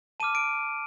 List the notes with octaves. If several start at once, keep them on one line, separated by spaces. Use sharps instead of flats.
A5 D6 F6 D#7
D7